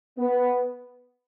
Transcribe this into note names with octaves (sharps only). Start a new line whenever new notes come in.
B3